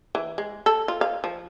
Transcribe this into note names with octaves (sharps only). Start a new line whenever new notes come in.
E3
G#3
A4
F4
F5
F3